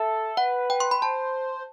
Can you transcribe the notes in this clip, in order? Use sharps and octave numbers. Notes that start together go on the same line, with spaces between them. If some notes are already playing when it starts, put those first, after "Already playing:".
Already playing: A4 E5
B4 F#5
G5
C6
B5
C5 A5